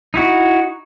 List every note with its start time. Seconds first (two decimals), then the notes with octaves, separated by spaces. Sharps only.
0.14 D#4 E4 F#4